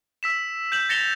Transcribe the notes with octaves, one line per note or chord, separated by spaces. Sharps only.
E6 B6 E7
G6 E7 F#7
A6 A#6 C#7 E7 F7 G7